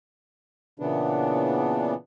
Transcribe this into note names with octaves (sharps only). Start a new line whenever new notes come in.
A#2 C#3 E3 B3 D4